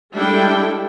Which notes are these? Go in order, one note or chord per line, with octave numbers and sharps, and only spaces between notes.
G3 G#3 D4 E4 A4 G5